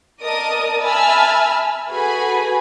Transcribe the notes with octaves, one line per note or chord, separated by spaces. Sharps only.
A#4 D5 D#5 A5 D#6
E5 G#5 A5 B5 E6 F6
F#4 G#4 A4 B4 G#5 B5